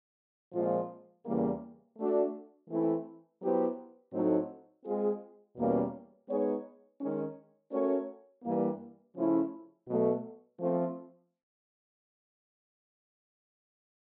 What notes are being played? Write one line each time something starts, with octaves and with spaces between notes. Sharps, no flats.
A#2 F3 G#3 C4 F4
E2 C#3 E3 G3 A#3
A3 D4 F#4
E3 A3 C4 E4
F#3 B3 E4 G4 C5
A2 F#3 A3 C4 D#4
G#3 C4 F4 G#4
E2 B2 G3 A#3 C#4
G#3 B3 D#4 G#4 C#5
D#3 G#3 C#4
A3 C#4 F#4 A#4 C#5
G2 E3 G3 A#3
C#3 F3 A3 C#4 E4
B2 F#3 A3
F3 A3 C4